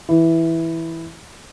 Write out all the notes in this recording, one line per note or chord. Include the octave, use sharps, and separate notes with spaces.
E3